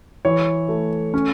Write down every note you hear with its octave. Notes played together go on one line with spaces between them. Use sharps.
E3 C#5
A3
C#4